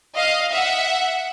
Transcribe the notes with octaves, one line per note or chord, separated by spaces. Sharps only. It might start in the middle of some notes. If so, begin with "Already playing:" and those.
D#5 F5
E5 F#5